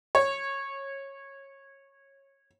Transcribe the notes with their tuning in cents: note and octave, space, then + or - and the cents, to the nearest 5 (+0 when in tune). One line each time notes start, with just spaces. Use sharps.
C#5 -20